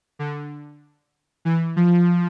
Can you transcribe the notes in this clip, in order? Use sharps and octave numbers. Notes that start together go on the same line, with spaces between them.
D3
E3
F3